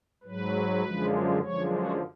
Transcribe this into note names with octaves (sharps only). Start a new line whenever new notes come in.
G#2 F#3 B4
F#2 D3 F3 G#3
F#2 D3 F3 G#3 C#5
F#4